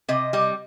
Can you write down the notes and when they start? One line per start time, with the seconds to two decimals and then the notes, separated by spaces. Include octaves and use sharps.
0.08 C3 D#5
0.33 G3 D#5